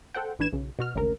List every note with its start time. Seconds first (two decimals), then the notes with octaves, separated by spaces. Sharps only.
0.14 A4 C5 F#5 G5
0.39 A1 E3 D4 B4 G#6 E7
0.53 B1 C#3
0.79 B2 F#4 F6
0.95 G#1 D2 C#3 A#4